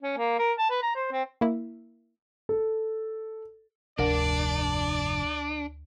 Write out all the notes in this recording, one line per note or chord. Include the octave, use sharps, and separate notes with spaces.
C#4
A#3
A#4
A5
B4
A#5
C5
C4
A#3 E4
A4
F1 D2 G#2 D4 A#4 D5